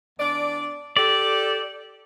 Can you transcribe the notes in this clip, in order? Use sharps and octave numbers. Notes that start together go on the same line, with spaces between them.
E2 D4 D5
G4 A4 D5